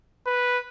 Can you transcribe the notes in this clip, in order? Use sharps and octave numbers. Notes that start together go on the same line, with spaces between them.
B4